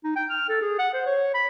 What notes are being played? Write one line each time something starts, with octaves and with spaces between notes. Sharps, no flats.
D#4
G5
F6
A4
G#4
F#5
C5
C#5
B5